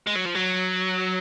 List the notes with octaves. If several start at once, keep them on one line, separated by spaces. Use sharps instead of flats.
G#3
F#3
F3
F#3